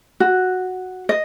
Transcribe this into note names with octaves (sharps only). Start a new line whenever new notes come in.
F#4
D#5